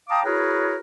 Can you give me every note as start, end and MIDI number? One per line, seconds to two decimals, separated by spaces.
0.09 0.22 77
0.09 0.22 79
0.09 0.22 81
0.09 0.22 82
0.09 0.22 86
0.09 0.22 87
0.25 0.77 64
0.25 0.77 66
0.25 0.77 68
0.25 0.77 70
0.25 0.77 71
0.25 0.77 73